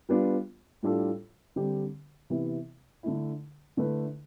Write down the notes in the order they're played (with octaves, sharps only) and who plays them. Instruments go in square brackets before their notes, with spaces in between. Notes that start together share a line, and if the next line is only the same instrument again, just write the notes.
[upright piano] G3 B3 D4 F4
A2 G3 D4 F4 A4
D3 G3 C4 G4
C3 E3 B3 E4
D3 A3 E4
D3 A3 E4 B4